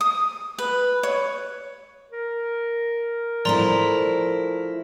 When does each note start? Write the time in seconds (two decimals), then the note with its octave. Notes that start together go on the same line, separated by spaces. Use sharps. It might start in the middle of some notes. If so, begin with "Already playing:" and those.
0.01 D#6
0.59 B4
1.03 C#5
2.11 A#4
3.45 F3 A3 E4 D5 A#5 C6